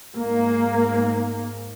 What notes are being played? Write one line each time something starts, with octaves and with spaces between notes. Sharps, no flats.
G#2 A#3